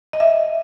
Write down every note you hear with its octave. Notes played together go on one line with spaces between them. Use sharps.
D#5
E5